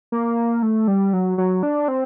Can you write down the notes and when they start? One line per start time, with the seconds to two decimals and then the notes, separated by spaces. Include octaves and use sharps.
0.12 A#3
0.63 A3
0.88 G3
1.13 F#3
1.38 F#3
1.63 D4
1.88 C4